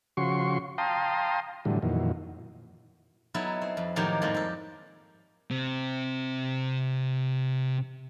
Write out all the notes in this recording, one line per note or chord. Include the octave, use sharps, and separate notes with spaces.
C#3 F3 F#4 C6 C#6
F5 G5 A5 A#5 C6 D#6
A2 D3 E3 F#3 G3
F2 A#2 D#3 E3 F#3
F#3 B3 D#4 E4 A4
C4
F2
A2 D#3 F3 F#3 A#3 G4
F2 G#2 F3 G3 A#3 F4
G4 A4
C3 C4